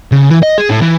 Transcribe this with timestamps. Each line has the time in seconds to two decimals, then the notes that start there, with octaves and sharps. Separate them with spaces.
0.12 C#3
0.30 E3
0.43 D#5
0.58 G#4
0.70 A2
0.81 E3